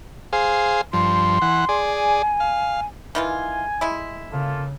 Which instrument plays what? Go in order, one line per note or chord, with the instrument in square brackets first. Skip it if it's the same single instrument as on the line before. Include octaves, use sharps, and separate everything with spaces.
[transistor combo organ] G#4 C5 F5
[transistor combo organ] G2 F3 [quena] C6
[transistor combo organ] E3 F#5
G#4 D5
[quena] G#5
[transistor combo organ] F5
[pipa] D#3 E3 F4 [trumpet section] G#5
[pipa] G#3 E4
[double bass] C#3 [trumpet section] A#3 F4 A4